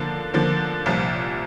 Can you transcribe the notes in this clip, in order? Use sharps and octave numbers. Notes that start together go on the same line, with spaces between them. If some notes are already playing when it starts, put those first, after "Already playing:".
Already playing: D3 F3 A#3
D3 F3 A#3
C2 A#2 F3